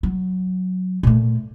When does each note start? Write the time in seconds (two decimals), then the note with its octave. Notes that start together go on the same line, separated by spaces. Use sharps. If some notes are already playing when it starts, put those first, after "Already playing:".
0.03 F#3
1.03 A#2 A3